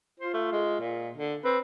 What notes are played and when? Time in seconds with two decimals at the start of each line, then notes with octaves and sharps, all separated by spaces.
0.20 F4 C5
0.34 A3
0.52 G#3
0.80 A#2
1.16 D3
1.45 C4 B4